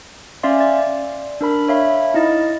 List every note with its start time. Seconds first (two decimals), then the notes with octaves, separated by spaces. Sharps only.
0.43 C#4 D5 E5 F5 C6
0.60 D5
1.41 D4 A#4 B5
1.68 C#5 E5 F5 B5
2.14 D#4 E4 D#5 A6